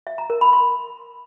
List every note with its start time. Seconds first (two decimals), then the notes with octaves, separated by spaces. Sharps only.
0.07 E5
0.18 A#5
0.30 A#4
0.41 B5
0.53 C6